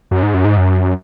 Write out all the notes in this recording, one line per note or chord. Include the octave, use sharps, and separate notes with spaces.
F#2
G#2
F#2
G#2
F#2